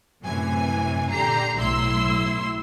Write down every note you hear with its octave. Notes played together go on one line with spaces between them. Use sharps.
F#2 A2 C3 E3 G#5
A#2 D3 G4 A#5 C7
B1 A2 E4 C6 E6